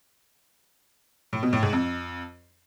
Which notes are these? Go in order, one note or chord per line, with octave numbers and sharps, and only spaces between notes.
A2
B2
A2
G#2
F2